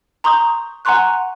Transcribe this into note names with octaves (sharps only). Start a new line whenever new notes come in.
A#5 C6 C#6 D#6 G6
F#5 G#5 A#5 C6 C#6 F#6